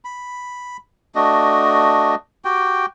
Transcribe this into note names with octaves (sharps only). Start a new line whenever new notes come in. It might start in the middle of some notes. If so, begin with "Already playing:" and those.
B5
A3 D4 F#4 D#5
F#4 G4 G5